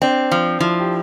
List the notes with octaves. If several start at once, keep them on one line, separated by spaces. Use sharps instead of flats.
C4 D4
F3
F3 E4
G4